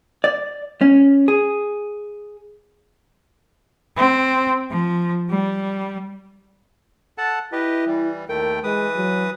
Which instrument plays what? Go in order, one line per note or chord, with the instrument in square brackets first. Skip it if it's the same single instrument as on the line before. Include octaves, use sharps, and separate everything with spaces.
[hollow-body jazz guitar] D5
C#4
G#4
[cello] C4
F3
G3
[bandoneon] A4 F#5 A5
[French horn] E4 [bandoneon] G4 B4 D#5
[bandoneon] E3 G3
[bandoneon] D#2 A3 G5 [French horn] A#4
[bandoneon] E3 B4 D#6 [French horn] G#3
[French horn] F#3